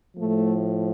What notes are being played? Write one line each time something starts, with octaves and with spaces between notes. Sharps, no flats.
A2 F3 A3